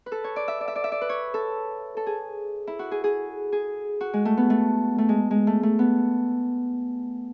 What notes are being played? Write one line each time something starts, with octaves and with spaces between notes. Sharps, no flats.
B4
A4
C#5
D5
E5
D5
E5
D5
E5
D5
B4
C#5
A4
A4
G#4
E4
F#4
G#4
G#4
G#4
F#4
G#3
A3
B3
A3
A3
G#3
G#3
A3
A3
B3